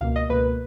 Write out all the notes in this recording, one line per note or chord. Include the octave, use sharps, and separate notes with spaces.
C#2 B2 A#3 F5
D#5
C#2 B2 A#3 B4